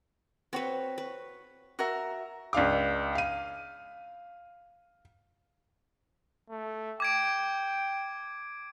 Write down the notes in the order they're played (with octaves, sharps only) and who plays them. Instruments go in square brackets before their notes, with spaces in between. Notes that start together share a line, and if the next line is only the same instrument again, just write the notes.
[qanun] C4 B4 [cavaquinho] F#4 C#5
[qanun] B4
[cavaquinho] F#4 A#4 E5
[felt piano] C#2 D4 F5 D6
F5 D#7
[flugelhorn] A3
[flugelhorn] G5 [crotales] D6 G#6 D7